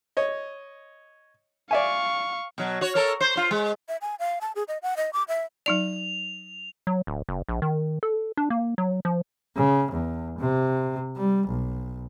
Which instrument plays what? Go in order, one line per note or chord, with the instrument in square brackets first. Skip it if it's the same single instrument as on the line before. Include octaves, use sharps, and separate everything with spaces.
[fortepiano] C#5 D#5
[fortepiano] D5 E5 G#5 [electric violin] F5 C#6
[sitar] B2 F#3
F#4 C#5
A4 A#4 C#5
C5
F4 C5
G#3
[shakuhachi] E5
G#5
F5
A5
G#4
D#5
F#5
D#5
D6
E5
[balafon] F#3 D#4 D5 [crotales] F7
[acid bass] F#3
D1
F#1
A#1
D#3
A4
D4
A#3
F#3
F3
[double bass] C#3
E2
C3
G3
B1